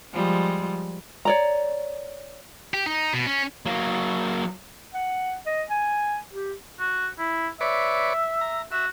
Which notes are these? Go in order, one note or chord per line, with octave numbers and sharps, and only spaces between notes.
F3 G3 G#3
C#5 D5 A#5
G4
D#4
B2
C#4
F#3 A#3
F#5
D#5
G#5
G4
F#4
E4
B4 C#5 D5 E5
A#5
F#4 E5